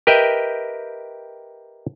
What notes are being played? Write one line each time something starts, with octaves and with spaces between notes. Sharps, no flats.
G4 A#4 B4 D#5 E5 G5